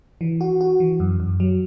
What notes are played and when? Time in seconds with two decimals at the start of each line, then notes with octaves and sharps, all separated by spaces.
0.21 E3
0.41 F#4
0.61 F#4
0.80 E3
1.00 F#2
1.20 F#2
1.40 F#3